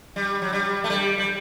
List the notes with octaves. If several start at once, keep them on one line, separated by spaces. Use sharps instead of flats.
G3
F#3
G3
A3
G3
G3